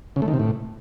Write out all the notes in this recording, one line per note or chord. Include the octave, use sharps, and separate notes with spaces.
C#3
A3
D#3
C3
A2